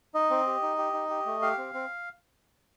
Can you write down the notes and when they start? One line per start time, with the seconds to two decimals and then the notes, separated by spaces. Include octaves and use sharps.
0.15 D#4 D#5
0.30 C4
0.47 G4
0.62 D#4
0.78 G4
0.94 D#4
1.10 G4
1.26 A3
1.42 G4 F5
1.58 C4
1.74 C4